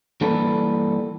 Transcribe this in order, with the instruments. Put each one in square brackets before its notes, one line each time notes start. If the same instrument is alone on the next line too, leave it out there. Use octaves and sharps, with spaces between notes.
[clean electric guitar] E3 G3 A#3 A4 B4